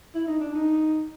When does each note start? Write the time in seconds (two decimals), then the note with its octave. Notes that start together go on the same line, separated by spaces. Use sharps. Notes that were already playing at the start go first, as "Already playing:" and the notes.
0.15 E4
0.27 D#4
0.40 D4
0.54 D#4